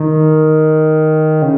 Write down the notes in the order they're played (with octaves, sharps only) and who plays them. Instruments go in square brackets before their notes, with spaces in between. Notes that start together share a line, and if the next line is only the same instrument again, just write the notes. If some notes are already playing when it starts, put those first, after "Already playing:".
Already playing: [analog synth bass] D#3
C#3